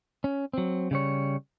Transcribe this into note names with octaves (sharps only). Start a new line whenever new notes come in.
C#4
F#3 C4
C#3 G3 C#5